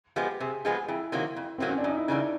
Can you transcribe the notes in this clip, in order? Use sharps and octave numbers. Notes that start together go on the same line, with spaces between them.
F3 G#3 B3 G4
C3 G#4
F3 G#3 B3 G#4
F2 E4
C3 D#3 F#3 A#3
F2
C3 D#3 F#3 A#3 C4
C#4
D4
F#2 D#4
E4
C#3 E3 G3 A#3 D4